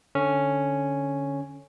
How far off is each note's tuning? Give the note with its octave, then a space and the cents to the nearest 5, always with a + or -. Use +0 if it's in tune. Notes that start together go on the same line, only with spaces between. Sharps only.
D3 +0 C#4 +0